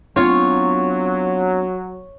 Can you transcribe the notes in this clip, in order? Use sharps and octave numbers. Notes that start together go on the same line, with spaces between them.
F#3 B3 C4 D4 F4 C#5